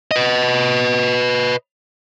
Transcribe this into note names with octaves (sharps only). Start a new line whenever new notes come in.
B4 D#5